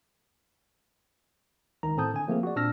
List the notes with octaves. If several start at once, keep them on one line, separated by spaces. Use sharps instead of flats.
C#2 D#3 A#5
A2 C4 A4 A5 D#6 G6
D3 G#5
F3 A3 A#3 C4 G#4
F#4 D5
A#2 C4 D4 E6 F6 A#6